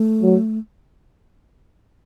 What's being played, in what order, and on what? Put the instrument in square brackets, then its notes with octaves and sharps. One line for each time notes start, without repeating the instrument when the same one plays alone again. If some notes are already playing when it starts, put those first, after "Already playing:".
Already playing: [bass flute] A3
[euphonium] F#3